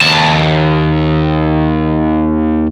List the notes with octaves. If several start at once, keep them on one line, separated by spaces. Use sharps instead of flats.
D#2 A5